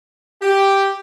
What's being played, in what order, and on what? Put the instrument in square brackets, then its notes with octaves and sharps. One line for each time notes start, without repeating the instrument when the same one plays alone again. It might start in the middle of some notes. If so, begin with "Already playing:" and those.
[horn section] G4